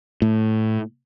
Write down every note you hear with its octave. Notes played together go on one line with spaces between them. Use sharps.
A2